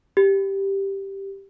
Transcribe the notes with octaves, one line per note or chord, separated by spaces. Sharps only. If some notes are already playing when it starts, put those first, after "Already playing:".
G4